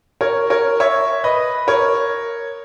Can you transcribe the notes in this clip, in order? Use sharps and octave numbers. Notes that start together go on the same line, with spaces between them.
A#4 C#5
A#4 C#5
C#5 E5
B4 D#5
A#4 C#5